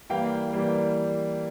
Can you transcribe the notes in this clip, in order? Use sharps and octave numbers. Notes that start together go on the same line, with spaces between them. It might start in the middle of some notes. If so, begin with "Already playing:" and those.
E3 G3 A#3 F5 G5
E3 G3 A#3